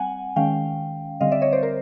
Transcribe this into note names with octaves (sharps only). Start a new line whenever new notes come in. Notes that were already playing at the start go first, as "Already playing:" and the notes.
Already playing: G3 C4 F#5 G#5
D#3 G#3 C#4 F5 G5
D3 G3 C4 D#5 F5
D5 E5
C#5 D#5
C5 D5
A#4 C5